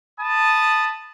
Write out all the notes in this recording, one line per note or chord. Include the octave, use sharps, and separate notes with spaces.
A5 B5 D#6